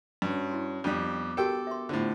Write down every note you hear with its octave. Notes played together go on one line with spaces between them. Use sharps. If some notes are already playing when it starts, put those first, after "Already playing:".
G2 C#4 F#4 C#5
E4 C6
F2 G3 B3 D4 D6
F#4 G4 A4 A#4 G5
E5 C6
A2 D3 B3 F4 C5